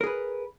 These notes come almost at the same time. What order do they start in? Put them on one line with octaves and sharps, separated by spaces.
A#4 G#4 B4